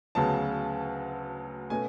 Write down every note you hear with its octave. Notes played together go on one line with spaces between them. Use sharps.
D2 C#3 F#3 B3 A5
B2 A3 C#4 G#5